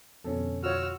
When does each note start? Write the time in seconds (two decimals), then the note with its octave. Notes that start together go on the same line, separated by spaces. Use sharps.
0.24 F2 B2 D3 C#4 A4
0.63 F4 F#4 C#5 E6 F6